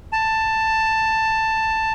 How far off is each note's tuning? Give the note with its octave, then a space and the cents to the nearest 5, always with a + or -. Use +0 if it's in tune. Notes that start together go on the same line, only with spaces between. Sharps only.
A5 +10